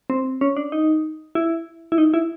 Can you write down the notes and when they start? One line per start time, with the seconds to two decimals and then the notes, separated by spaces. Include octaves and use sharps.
0.10 C4
0.41 C#4
0.57 D4
0.72 D#4
1.35 E4
1.92 E4
1.98 D#4
2.14 E4